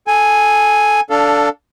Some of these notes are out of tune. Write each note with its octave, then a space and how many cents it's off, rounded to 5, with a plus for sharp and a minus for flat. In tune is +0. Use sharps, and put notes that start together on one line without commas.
A4 -15 G#5 +0
D4 -15 A4 +10 F5 +0